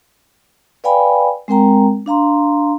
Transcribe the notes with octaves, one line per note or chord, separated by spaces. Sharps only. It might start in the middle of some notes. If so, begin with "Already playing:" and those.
B4 D5 F5 G5 G#5 B5
G#3 C4 A#4 G5 A#5
D4 F5 A#5 C6